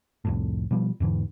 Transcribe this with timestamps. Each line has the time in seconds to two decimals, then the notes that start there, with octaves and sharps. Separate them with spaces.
0.25 C2 F2 A2
0.71 B2 F3 G3
1.00 E2 G#2 D3 E3